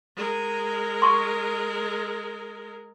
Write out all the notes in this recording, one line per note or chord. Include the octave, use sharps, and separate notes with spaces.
G#3 A#4
C6 C#6